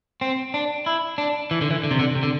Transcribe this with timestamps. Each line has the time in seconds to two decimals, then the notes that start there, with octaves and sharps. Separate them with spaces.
0.21 C4
0.54 D4
0.86 E4
1.18 D4
1.51 E3
1.61 D3
1.71 E3
1.84 D3
1.91 C3
1.99 D3
2.15 C3
2.23 D3